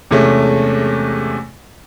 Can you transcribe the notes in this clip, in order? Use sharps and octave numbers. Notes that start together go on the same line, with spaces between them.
E2 C3 G#3 A3 C#4